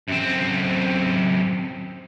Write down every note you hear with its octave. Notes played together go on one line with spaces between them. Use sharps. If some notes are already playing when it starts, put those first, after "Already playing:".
F#2 C4